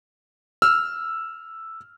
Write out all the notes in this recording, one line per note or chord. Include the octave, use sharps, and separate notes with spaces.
E6 F6